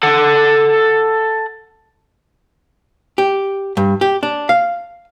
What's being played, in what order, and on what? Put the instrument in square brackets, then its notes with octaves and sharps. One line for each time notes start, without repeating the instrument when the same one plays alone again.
[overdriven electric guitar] A4 F#5
[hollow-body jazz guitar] G4
G2
G4
D4
F5